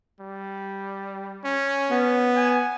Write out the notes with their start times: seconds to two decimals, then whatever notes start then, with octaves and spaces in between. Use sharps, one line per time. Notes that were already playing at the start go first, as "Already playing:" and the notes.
0.20 G3
1.44 C#4
1.91 B3
2.36 G#5